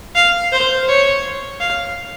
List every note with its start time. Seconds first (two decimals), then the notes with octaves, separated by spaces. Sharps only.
0.15 F5
0.52 C5
0.88 C#5
1.60 F5